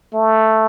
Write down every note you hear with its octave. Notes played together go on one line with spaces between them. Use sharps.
A3